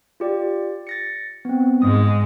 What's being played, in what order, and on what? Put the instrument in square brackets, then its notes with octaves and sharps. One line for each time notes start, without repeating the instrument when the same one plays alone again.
[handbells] F4 G4 D5
A6 A#6 C#7
B3 C4
[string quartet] G#2 G#3 [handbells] D#6